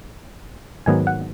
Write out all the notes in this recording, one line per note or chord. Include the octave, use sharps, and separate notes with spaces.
G#2 D#3 F#3 B3 G#5
F#5